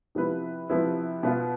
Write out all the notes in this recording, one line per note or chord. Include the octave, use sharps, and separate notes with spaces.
C3 F3 B3 E4 B4
C3 F3 B3 E4 B4
B2 B3 F4